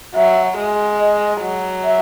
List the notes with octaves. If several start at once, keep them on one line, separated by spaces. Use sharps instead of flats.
F#3 E5
G#3
D#5
F#3
E5